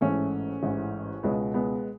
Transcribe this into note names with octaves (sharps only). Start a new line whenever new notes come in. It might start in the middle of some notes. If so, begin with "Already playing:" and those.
A1 G#2 E3 A3 C#4
A1 G#2 E3
C#2 B2 G#3 B3
G#3 B3